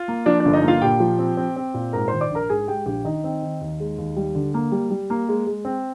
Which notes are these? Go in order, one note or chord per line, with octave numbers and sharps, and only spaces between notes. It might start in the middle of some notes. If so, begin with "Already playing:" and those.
Already playing: F4
A#3
F3 D4 D5
D4 D5
G1
D#4 D#5
A#3 F4 F5
A#2 G4 G5
F3
C4
C4
C4
A#2
G#2 A#4 A#5
D#3 C5 C6
D5 D6
A#1
A#4 A#5
G#2 G#4 G#5
G#3 G4 G5
A#1 G4 G5
D#3 D#4 D#5
C4
D#3
D#2
G#3
D#2
G3
D3
A#3
G3
G3
A#3
G#3
G#3
C4